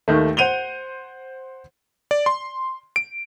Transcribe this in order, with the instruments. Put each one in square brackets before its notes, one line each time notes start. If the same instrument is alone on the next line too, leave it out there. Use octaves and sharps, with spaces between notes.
[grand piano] D#2 D#3 A3
C5 F#5 D#7 F7 G7
[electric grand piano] D5
C6
D7